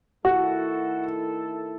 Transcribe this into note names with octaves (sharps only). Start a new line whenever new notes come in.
D#3 A3 E4 F#4 A4